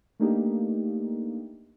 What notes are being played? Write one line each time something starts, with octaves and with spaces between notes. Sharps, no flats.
A3 A#3 D4 D#4 G4